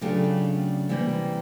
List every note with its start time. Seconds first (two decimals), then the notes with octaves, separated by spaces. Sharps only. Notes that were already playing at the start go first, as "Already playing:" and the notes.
0.01 C#3 F#3 A3 D4 F4 G4
0.89 C3 E3 G3 A#3